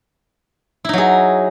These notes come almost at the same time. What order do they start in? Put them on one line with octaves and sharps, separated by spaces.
E4 D#4 F#3 G#4